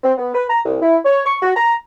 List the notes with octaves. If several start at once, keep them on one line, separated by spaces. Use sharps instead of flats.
C4
B3
B4
A#5
C2
E4
C#5
C#6
F#4
A#5